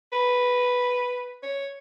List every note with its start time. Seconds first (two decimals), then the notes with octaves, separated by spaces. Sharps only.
0.13 B4
1.43 C#5